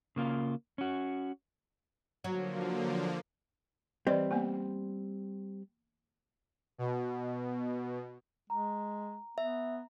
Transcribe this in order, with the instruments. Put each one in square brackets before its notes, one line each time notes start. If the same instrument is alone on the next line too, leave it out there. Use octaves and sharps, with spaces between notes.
[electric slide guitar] C#3 A#3 F4
C#4 F#4
[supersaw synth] D3 F3 A#3 [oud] F#3
[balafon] E3 D5 D#5 [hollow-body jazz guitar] G3 C4
[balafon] A#3 B3 G#5
[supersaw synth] B2
[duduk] G#3 [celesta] A#5
[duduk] B3 [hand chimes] E5